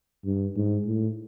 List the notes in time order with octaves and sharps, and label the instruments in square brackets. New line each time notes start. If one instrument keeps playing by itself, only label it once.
[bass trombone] G2
G#2
A2